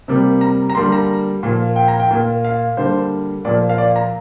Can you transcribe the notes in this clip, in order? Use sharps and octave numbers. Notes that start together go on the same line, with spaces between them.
C3 G3 A#3
A#5
A#5
D3 G3 A#3 C6
A#5
A#2 F3 A#3
G5
A#5
G5
A#2 A#3
F5
D3 G3 A#3 C5
A#2 F3 A#3 D5
F5
D5
A#5